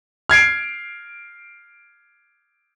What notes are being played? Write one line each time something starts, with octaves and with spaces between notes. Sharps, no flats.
F6 G#6 C7 D7